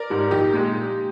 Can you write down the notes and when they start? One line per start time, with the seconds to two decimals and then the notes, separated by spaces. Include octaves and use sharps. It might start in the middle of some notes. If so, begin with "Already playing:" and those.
Already playing: A#4 D5
0.10 G#2 G3
0.31 A#1 D#4 G4
0.53 A#2 G#3